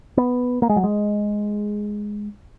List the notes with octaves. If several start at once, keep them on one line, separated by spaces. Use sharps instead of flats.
B3
A#3
G#3
F#3
G#3